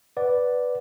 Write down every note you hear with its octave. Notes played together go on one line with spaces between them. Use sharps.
B4 D5 F#5